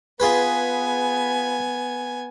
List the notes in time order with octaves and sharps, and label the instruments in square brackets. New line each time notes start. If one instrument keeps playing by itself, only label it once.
[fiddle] B3 G#5 [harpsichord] F4 G#4 B4